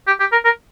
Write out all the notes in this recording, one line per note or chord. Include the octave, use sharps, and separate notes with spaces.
G4
G4
A#4
A#4